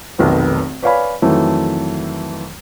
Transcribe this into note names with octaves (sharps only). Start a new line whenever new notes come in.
F1 B1 D#3 B3
B4 C#5 D5 F5 G#5 B5
F2 D#3 E3 F#3 A3